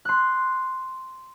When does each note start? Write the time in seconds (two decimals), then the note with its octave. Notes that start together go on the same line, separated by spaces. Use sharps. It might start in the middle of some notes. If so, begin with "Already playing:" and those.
0.05 C6 F#6